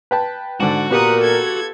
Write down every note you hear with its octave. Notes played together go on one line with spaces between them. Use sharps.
B4 G5 A5
G#2 D3 F#4 D5
A#2 B3 F4 G4 A#4 F#5 D#6
A4 G#6